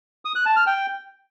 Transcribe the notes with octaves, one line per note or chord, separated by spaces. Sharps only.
D#6
F#6
A5
F6
G5